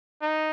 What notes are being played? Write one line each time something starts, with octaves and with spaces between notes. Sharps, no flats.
D#4